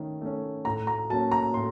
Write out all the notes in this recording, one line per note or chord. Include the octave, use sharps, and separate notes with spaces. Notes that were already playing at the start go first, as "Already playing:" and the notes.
Already playing: D#3 A3 C#4
A3 C#4
A2 A#5
A#5
F#3 A#3 C#4 A5
A#5
A2 C6